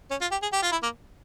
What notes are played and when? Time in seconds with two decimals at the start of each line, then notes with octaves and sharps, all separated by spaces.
0.11 C#4
0.21 F4
0.31 G4
0.42 G#4
0.53 G4
0.62 F4
0.72 E4
0.83 A#3